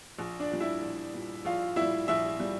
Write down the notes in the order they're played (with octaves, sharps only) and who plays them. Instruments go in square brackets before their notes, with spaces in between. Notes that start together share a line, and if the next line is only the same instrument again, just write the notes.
[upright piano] A#1
D4 D5
A#2 G3
E4 E5
A#1
A#2 G3
A#1 F4 F5
A#2 G3 E4 E5
A#1 E4 E5
A#2 G3